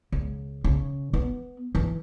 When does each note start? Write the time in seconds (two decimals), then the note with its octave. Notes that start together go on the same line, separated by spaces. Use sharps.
0.12 C#2
0.64 C#3
1.13 B3
1.75 E3